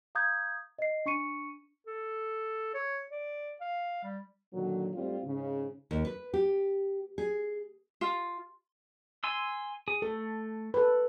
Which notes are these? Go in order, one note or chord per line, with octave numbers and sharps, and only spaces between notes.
F5 A#5 D#6 G6 G#6
D#5 C7
D4 C#6 C#7 D#7
A4
C#5
D5
F5
G3
A#2 D3 D#3 F#3
G#2 G3 A3 C4 F4
G#2 C#3
D#2
B4
G4
G#4
F4
G#5 C6 E6
G#4
A3 A4
A4 B4